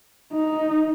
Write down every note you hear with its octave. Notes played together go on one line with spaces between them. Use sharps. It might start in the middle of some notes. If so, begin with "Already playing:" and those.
D#4